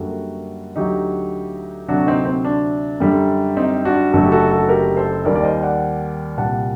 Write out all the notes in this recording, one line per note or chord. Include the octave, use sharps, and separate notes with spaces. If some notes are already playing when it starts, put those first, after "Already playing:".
Already playing: F#2 D3 G3 A#3 F#4 A4
D2 D3 F#3 D#4 G4
D2 C3 F#3 D4 F#4
C4 D#4
C4
D4
F#2 D3 G3
C4 D#4
D4 F#4
F#1 F#2 D3 F#3 A3 F#4 A4
G4
F#4 A4
F#4 A4
G4 A#4
A4 C5
D#2 D#3 G3 A#3 A#4 D5
D5
C5 D#5
D5 F#5
C2 A#2 G3 F#5 A5